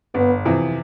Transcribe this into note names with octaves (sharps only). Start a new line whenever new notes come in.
G1 B3
F2 C3 E3